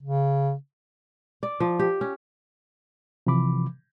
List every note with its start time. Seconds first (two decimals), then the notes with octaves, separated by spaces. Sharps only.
0.03 C#3
1.43 D5
1.60 F3
1.79 G4
2.01 C#4
3.27 C3 E3 F3 B5 D6